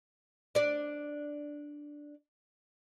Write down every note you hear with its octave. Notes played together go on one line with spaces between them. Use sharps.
D4 D5